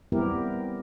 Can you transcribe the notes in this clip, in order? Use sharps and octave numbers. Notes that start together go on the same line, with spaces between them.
G3 B3 C4 E4 G4 A#4